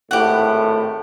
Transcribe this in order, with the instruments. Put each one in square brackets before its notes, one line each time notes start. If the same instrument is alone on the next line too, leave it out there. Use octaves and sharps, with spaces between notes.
[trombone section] G#1 A2 [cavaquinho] G4 F#5